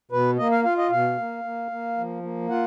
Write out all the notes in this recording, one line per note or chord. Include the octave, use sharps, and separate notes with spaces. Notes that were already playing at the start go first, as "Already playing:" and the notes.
B2 B4
A#3 D#5
F5
F4 F5
D#5
B2 F5
A#3
A#3
A#3
F3
A#3
F4 F#5